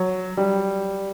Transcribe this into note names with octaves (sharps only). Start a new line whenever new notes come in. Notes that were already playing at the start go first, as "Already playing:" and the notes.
Already playing: F#3
G3